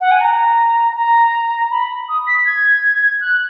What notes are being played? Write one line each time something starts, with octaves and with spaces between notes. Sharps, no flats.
F#5
G#5
A#5
A#5
B5
D#6
B6
G#6
F#6